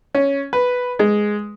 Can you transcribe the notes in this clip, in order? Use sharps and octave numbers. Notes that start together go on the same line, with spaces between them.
C#4
B4
G#3